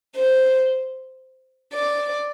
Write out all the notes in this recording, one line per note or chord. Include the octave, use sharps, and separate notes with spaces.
C5
D5